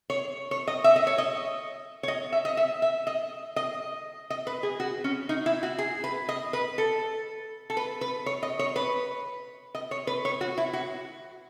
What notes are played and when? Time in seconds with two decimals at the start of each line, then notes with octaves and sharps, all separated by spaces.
0.10 C#5
0.51 C#5
0.67 D#5
0.84 E5
0.96 D#5
1.07 C#5
1.18 D#5
2.03 C#5
2.08 D#5
2.32 E5
2.45 D#5
2.57 E5
2.82 E5
3.07 D#5
3.56 D#5
4.30 D#5
4.47 B4
4.63 G#4
4.80 F#4
5.04 C#4
5.29 D#4
5.46 E4
5.63 F#4
5.79 G#4
6.04 B4
6.29 D#5
6.53 B4
6.78 A4
7.70 A4
7.77 B4
8.01 B4
8.26 C#5
8.43 D#5
8.59 C#5
8.76 B4
9.75 D#5
9.91 C#5
10.07 B4
10.25 C#5
10.41 F#4
10.58 E4
10.73 F#4